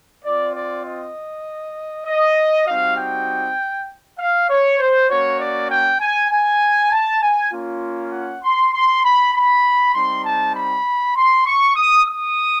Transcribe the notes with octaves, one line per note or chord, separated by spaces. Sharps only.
C4 F4 D5
D5
D#5
D#5
G3 C4 D#4 F#4 F5
G5
F5
C#5
C5
A#3 C#4 F#4 C#5
D5
G5
G#5
G#5
A5
G#5
A#3 C#4 F4
F#5
C6
C6
B5
B5
G3 C4 D#4 C6
A5
B5
C6
C#6
D#6
D#6